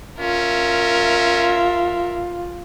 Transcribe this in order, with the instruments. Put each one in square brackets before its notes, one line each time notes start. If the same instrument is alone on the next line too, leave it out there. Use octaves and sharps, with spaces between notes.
[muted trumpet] C#4 [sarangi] F4 [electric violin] A#4 E5